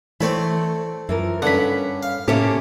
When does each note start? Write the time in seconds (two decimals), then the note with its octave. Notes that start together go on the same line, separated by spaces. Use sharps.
0.21 E3 A3 C4 A4 C#5 D5 B5
1.09 F#2 E3 F3 A#4
1.42 G2 D3 C#4 F#5 B5
2.03 F5
2.28 A2 C3 A#3 C#4 G4 A4 C5